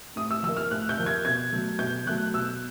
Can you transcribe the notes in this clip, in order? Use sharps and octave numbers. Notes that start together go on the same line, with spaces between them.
A2 D#6
E6
F3 A#3 E6
F6
A2 F#6
G6
F3 A#3
G#6
B2 G#6
F#3 A3
B2 G6
F#3 A3 F#6
B2 E6